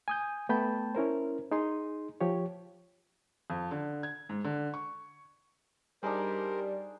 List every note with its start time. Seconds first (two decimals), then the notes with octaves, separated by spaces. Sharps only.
0.08 G#5 D#6 G6
0.49 A3 B3 G5 A5 B5 G6
0.95 C#4 E4 A#4 C5
1.51 D#4 G#4 C6
2.21 F3 G4 C#5
3.50 F2
3.71 D3
4.03 G#6
4.29 G#2
4.44 D3
4.74 C#6
6.03 G3 D4 D#4 G#4 A#4 C5